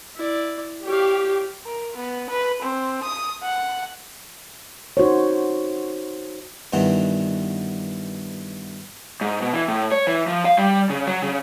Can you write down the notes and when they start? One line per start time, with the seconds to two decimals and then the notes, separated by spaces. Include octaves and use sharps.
0.16 E4 D5
0.86 G4 C#5 F5
1.65 A#4
1.97 B3
2.30 B4
2.62 C4
3.03 D#6
3.43 F#5
4.97 D#4 F#4 C5 C#5
6.73 G2 B2 D#3 E3 F#5
9.21 G#2
9.42 B2
9.53 E3
9.68 A2
9.92 C#5
10.07 E3
10.28 F3
10.45 F5
10.57 G3
10.90 C#3
11.07 F#3
11.22 C#3